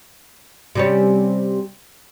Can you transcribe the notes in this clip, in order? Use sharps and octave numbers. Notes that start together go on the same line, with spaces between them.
C3 G3 C#4